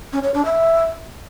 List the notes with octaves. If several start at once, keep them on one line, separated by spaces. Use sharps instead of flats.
C#4
C#5
D4
E5